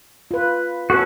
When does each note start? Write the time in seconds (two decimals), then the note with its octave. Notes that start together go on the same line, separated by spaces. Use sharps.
0.31 F4 B4
0.90 C#4 F#4 A4 B4